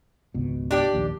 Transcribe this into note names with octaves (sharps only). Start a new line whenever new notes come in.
G#1 C#2 B2
D4 G4 D5
A#1 D#2